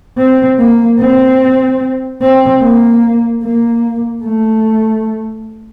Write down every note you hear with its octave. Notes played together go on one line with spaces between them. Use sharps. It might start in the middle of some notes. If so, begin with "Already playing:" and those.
C4
A#3
C4
C4
A#3
A#3
A3